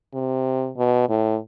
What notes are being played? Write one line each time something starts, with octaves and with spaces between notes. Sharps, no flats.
C3
B2
A2